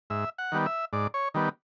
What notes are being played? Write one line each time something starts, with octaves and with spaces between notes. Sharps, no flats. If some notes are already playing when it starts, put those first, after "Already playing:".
G#2 E5
F#5
D#3 G3 B3
E5
G#2 D5
C#5
D#3 G3 B3